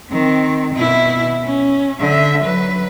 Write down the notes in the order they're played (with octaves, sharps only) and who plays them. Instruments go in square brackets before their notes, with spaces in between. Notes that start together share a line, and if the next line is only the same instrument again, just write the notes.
[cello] D#3 C4
B2 E4
C#4
D3 E5
F#3 B4